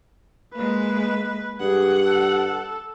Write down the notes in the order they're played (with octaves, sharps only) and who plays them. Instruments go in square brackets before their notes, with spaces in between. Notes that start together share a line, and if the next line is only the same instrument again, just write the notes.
[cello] G#3 A#3 [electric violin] B4
[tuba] G2 [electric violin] G#4 [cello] F#5
[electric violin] A4